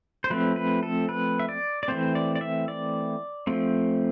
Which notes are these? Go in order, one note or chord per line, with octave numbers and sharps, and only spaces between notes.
C5
F3 A3 C4 B4
B4
A4
B4
E5
D5
D5
E3 A3 C4 C5
D5
D5
E5
D5
F3 A3 C4